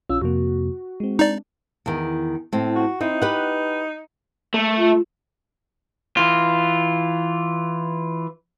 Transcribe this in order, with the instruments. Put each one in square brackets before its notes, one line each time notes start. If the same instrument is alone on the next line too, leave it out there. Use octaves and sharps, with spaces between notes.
[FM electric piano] A#1 C#4 F4 [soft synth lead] E6
[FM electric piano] F2 C3 A#3 [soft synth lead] F#4
[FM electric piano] G#3 C4
[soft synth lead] D4 [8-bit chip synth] D#4 D5
[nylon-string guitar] E2 D#3
A2 C4
[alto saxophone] F#4
[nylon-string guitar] C4 E4 [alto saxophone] D#4
[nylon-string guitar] G4 B4 F#5
[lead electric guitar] A3
[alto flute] F4
[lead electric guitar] E3 F4